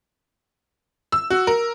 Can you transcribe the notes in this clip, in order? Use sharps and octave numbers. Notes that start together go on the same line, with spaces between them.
E6
F#4
A#4